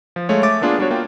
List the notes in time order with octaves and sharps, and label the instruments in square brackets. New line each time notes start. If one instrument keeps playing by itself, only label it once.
[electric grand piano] F3
G#3 A3 C#5 F5
A3 E5 D6 A6
A#3 B3 D4 F4 G#4
G3 D4 F#4 C#5
A#3 F4 G5